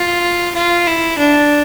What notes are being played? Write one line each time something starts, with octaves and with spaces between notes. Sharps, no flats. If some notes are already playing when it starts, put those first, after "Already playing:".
Already playing: F4
F4
E4
D4